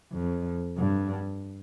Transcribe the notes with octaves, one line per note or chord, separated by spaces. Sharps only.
F2
G2